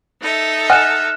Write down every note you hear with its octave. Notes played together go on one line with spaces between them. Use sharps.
D#4 A4 E5
D#5 F#5 G#5 F6 F#6 E7